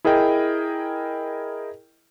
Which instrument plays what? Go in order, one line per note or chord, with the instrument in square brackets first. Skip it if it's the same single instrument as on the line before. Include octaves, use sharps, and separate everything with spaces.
[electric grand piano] E4 G#4 A#4 D#5 G5